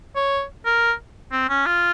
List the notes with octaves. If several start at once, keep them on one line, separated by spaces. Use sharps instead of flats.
C#5
A#4
C4
C#4
F4